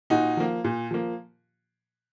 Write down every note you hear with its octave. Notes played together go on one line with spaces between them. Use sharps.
A#2 D#4 F#4
F3 A#3
A#2
F3 A#3